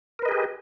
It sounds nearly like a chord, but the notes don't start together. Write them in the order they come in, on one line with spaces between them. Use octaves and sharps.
A#4 B4 D#5 G#4 G4